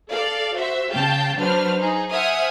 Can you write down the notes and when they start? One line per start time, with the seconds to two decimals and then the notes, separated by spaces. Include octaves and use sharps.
0.10 A4 D5 F5
0.55 F#4 C5 E5
0.91 C#3 F5 G5 A5 G6
1.37 F#3 D4 B4 C5 F6
1.79 D#4 G#4
2.12 C5 E5 F#5 G#5 D#6 F6